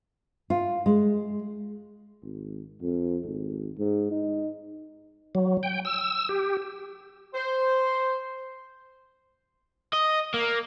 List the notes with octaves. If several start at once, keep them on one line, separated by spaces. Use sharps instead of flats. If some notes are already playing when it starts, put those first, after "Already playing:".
F4
G#3
G#1
F2
G#1
G#2
D#4
F#3
G5
E6
G4
C5
D#5
A#3